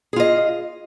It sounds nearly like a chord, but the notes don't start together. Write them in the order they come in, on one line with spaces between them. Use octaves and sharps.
G#4 F4 D#5